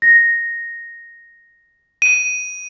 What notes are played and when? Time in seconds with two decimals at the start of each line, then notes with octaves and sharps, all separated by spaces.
0.02 A#6
2.02 D#7